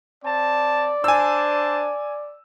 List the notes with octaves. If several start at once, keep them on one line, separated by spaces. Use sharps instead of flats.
C4 D5 A5
D4 C5 G#5 A5 E6